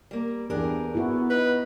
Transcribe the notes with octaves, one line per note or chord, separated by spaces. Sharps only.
G3 A#3
E2 D4 G4 G#4 A#4
B3 E4 F#4
D#4 B4